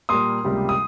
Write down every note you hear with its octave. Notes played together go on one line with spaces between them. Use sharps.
A#2 G3 A#3 C6 D#6
C#2 C3 G3 A#3
D#6